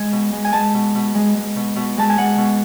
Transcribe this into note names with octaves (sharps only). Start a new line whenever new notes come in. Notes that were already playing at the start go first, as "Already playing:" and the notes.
Already playing: G#3 G#5
B2
G#3
G#5
G#3 A5
B2
B2
G#3
G#3
B2
B2
G#3 A5
G#5
G#3 F#5
B2